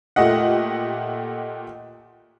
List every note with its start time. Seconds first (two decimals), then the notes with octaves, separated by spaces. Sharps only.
0.16 A#2 A3 G4 D#5 F#5